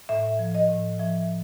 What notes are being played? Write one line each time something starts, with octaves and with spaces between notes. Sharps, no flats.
A2 E5
F3
D#5
A2
F3 E5